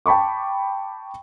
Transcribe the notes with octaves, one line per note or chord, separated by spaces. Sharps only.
G5 A5 B5 C#6 D6